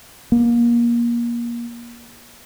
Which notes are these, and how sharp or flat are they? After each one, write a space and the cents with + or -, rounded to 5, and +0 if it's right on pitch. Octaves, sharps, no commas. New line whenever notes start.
A#3 +25